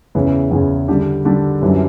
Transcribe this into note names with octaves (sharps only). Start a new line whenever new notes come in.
E2 C#3 E3
E2 C#3 E3
D3 G3 D4 G4
D3 G3 D4 G4
F#2 E3 G3 D4